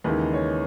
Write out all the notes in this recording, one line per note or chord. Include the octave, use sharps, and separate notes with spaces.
D#2 C#3 E3 G#3 D#4 B4
C#5